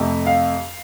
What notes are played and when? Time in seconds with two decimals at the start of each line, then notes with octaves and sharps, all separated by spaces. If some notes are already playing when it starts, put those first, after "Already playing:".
Already playing: F2 C3 A3
0.26 F5